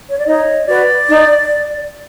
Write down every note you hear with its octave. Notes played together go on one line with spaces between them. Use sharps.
C#5
D5
D#4 C#5 D#5
F#4 B4 D5
D#4